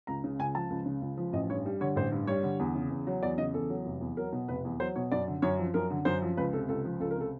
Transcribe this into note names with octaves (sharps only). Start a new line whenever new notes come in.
C#2 A#5
C#3
C#2 G#5
F3 A5
C#2
C#3
C#2
F3
A1 D#5
G2 C#5
G3
D3 C#5
A1 C5
G2
G3 C#5
D3
E2
C#3
E2
F#3
E2 D5
C#3 D#5
E2 A4
F#3
F1
E2
F#3 A#4
B2
F1 B4
E2
F#3 C5
B2 C#5
F#2 D5
D3
F#2 C#5
F3
F#2 A#4
D3
F#2 C5
F3
C#2 B4
C3 A4
C#2 A4
F3
C#2 A4
A#4
C3 A4